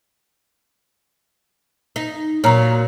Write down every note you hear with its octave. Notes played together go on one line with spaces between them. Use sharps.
D#4
A#2 F#3 C#5 A#5